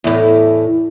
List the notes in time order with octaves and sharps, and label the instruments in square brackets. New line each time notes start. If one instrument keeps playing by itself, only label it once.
[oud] E2 A2